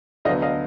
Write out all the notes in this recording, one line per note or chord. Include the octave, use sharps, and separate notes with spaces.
D2 D3 F#3 B3 D#5 F5
D#5 F5